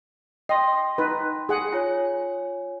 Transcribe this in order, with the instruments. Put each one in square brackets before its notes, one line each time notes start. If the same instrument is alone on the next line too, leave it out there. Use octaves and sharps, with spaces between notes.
[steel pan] D#5 [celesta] G5 C6
[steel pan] D#4 B4
G#4 F#5
[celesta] F4 C#5 G#5